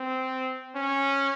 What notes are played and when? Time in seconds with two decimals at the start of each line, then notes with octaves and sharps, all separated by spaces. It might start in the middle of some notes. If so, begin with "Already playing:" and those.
Already playing: C4
0.76 C#4